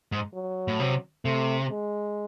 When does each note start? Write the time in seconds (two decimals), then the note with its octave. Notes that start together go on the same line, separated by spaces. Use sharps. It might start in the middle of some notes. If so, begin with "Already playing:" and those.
0.12 G#2
0.34 F#3
0.68 A2
0.80 C3
1.25 C3 A3
1.70 G#3